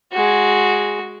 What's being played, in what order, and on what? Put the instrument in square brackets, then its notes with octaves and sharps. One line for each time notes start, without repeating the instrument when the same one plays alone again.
[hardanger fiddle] G#3 F#4